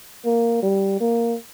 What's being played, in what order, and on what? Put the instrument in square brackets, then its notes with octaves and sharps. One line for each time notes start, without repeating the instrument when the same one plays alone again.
[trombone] A#3
G3
A#3